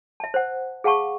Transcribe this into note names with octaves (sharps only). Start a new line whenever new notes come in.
E5 A5
C5 F#5
G#4 F5 F#5 A5 C#6